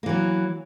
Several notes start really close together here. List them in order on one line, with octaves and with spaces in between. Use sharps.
A#3 E3 F#3